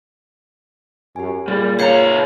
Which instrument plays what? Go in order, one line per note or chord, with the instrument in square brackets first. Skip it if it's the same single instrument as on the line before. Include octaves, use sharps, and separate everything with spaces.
[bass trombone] F#2 [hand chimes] G4 G#5
[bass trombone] A#2 [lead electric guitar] G3 [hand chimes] G#4
[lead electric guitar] C#2 A#5 [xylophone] C#5 F5 C#7